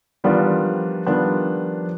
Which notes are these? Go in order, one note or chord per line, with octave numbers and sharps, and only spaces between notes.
D#3 E3 G3 B3 D4 F4
F3
D#3 G3 B3 D4 F4